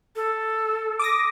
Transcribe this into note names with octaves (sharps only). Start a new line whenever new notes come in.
A4
D6 D#6 A#6